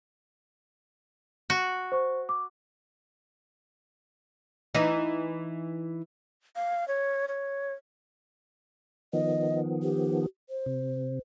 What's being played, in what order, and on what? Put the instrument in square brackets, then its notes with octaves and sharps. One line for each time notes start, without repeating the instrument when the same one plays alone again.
[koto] F#4
[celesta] C5 C#6
D6
[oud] E3 D#4
[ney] F5
C#5
C#5
[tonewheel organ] D#3 F3 B3 [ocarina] D#5
[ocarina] G4
C5
[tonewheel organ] C3